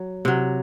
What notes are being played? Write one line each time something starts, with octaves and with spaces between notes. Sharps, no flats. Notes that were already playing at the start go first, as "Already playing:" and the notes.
Already playing: F#3
C3 F#3